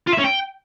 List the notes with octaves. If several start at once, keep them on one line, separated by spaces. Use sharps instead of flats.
F4
E5
C#4
G5